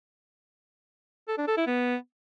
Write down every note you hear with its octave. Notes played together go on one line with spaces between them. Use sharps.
A4
D4
A4
E4
B3